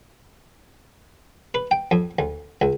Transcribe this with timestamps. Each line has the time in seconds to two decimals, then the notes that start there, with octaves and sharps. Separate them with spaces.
1.54 B4
1.71 G5
1.91 F2
2.19 D2
2.62 C#2